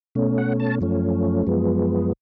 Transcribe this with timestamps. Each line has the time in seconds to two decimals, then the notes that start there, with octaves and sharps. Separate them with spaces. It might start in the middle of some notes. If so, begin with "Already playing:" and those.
0.15 B2 A3 C#4
0.38 F#5
0.60 A5
0.81 F#2 F3 A3 C#4
1.47 F#2 F3 G#3 B3